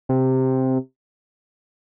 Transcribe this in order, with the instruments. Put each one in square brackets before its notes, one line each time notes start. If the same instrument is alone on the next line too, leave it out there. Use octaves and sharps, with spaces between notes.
[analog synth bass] C3